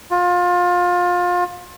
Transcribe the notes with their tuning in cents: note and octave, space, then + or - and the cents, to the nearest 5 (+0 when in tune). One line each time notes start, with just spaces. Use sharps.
F4 +25